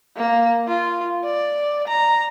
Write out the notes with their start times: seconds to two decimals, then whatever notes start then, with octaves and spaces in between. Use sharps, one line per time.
0.17 A#3
0.68 F4
1.24 D5
1.87 A#5